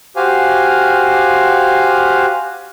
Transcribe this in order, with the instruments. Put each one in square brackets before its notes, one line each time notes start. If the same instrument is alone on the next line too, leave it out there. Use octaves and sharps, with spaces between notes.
[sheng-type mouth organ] F#4 G4 C5 F5 G#5